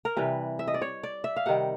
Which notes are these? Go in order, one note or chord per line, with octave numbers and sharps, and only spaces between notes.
A#4
C3 E3 G3 B4
E5
D#5
D5
C#5
D5
E5
F5
C3 D#3 G3 F#5